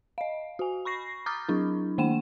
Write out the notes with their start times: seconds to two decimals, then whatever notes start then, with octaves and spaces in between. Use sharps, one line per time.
0.18 D#5 F5
0.59 F#4 G#5
0.85 B5 C#6 A#6 C7
1.26 A#5 D6 D#6 F6 G6 A6
1.49 F#3 D4 E4
1.98 D#3 A#3 D4 F#5 G5 E7